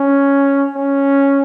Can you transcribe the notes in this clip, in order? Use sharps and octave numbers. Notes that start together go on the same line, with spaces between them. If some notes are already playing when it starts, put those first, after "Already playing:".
Already playing: C#4
C#4